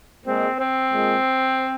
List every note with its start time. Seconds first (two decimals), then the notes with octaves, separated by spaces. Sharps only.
0.24 A#2 G#3 C4
0.58 C4
0.92 A#2 G#3